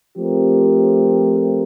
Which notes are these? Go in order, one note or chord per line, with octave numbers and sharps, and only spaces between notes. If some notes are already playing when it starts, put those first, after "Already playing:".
F3 A3 C4 G4 A#4